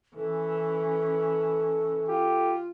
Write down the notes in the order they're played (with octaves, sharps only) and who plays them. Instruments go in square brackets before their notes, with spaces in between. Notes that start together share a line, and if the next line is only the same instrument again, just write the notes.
[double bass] E3 C#4 [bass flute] A4
[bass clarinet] F4 [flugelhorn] G4